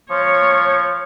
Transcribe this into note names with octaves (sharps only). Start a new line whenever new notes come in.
F3 C#5